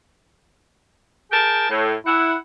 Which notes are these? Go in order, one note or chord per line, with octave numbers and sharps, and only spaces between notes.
G#4 A#4 G5 A5
A2
E4 F#5